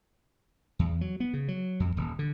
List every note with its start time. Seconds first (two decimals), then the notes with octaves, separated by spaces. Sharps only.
0.79 E2
1.01 F#3
1.20 B3
1.33 C#3
1.48 F#3
1.80 F2
1.97 D#1
2.19 D3